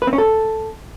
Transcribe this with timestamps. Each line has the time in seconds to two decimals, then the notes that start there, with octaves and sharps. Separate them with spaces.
0.02 B4
0.07 C4
0.13 C#4
0.18 A4